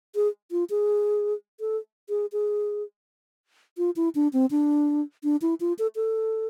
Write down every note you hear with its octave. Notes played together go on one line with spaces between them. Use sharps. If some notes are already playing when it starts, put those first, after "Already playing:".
G#4
F4
G#4
A4
G#4
G#4
F4
E4
D4
C4
D4
D4
E4
F4
A4
A4